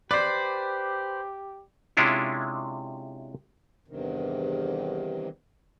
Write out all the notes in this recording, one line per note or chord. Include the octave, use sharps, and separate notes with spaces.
G4 B4 C5 D5
C3 G#3 C#4 D4 E4 F4
E2 G2 C3 D#3